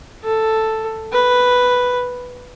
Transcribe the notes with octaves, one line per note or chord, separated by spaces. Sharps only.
A4
B4